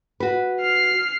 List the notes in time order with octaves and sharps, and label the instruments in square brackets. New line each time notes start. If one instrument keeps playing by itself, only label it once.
[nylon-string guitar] F#4 B4
[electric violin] F6 C7